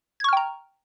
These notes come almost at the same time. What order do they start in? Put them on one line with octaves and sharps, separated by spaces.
G#6 C#6 F6 G5 A#5